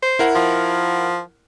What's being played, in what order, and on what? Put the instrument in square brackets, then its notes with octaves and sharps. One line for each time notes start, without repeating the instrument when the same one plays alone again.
[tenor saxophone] C5
[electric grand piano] E4 A#4 F#5
[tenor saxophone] F3